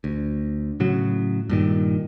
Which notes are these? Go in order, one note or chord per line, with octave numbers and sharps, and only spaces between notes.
D2
A2 C#3 F#3
G2 A#2 D#3